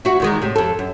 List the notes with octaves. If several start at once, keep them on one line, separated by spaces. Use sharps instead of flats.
E4 F#4
E2 D#3 G#3
A2 C3
F2 A4
F#2